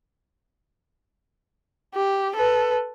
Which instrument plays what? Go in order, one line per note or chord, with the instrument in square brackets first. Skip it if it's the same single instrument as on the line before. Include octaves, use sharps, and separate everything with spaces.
[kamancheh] G4
A4 B4